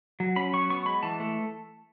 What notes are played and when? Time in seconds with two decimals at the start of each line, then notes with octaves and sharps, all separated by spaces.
0.20 F#3
0.36 C#4 B5
0.54 F#3 C#6
0.70 B3 C#6
0.86 G#3 B5
1.03 E3 A5
1.20 A3